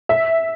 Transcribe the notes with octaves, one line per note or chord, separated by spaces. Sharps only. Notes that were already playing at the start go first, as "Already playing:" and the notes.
E5